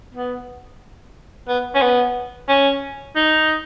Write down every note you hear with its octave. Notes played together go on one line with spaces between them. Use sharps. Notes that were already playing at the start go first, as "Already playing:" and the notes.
B3
B3
C#4
B3
C#4
D#4